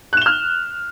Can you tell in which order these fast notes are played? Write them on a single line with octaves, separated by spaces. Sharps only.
F#6 E7 G7 F6